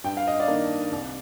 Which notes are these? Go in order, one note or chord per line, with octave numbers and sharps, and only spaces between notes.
G2 G5
F5
D#5
D5 F5
D#3 A#3 D4
C2